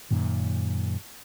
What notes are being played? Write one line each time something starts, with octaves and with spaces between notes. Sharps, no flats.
F#2 A#2 D#3